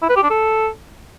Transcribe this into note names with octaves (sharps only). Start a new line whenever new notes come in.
E4
B4
G4
D4
A4